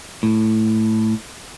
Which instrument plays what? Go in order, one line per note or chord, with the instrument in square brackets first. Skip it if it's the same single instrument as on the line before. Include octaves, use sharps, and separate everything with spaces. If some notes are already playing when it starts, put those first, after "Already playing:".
[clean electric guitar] A2